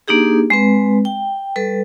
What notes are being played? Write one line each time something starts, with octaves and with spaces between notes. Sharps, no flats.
A#3 D4 D#4 G4 G#4
G#3 C4 B4
G5
G3 A4 B4